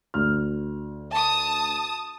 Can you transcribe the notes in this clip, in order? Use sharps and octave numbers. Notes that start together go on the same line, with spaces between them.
D2 F6
A5 D#6